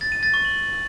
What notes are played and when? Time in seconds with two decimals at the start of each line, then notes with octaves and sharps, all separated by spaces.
0.01 A6
0.12 D#7
0.23 A6
0.34 C#6
0.44 F#7